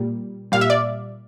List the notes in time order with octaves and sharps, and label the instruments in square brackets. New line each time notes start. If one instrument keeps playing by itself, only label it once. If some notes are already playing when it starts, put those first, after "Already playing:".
Already playing: [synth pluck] A#2 G3
A#2 G3 F5
E5
D5